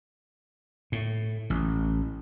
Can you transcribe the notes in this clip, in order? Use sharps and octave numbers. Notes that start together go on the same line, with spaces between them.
A2
A1